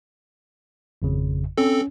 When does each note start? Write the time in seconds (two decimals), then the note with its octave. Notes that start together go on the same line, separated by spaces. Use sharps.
1.02 G#1 F2 C#3
1.57 C4 C#4 A4